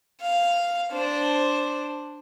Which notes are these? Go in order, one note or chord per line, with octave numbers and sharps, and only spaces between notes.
F5
D4 C5